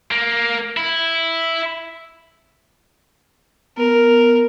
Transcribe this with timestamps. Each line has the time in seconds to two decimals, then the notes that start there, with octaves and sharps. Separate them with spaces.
0.11 A#3
0.77 E4
3.77 B3 A#4